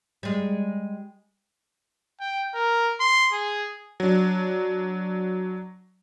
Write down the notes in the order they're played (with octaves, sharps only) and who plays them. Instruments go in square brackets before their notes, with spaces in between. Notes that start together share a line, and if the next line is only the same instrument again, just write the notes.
[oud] G3 G#3
[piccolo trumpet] G5
A#4
C6
G#4
[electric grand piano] F#3 D4